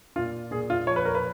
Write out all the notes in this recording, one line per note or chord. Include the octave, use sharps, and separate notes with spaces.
A#2 F4
A#2 G#4
F4
F3 C#5
B4
A#4
B4